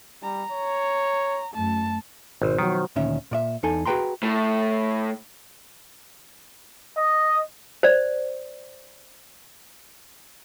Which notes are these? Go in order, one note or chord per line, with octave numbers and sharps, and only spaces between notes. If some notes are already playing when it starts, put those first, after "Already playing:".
G3 A#5
C#5
F#2 A3 A5
G#1 B2 C5
D#3 F3 F#3 F#4
D2 A#2 D#3 C#4 E5
A#2 D5 E5
E2 D#4 A4 G#5
F#4 G#4 B4 G5 A#5 C6
A2
D#5
C5 D5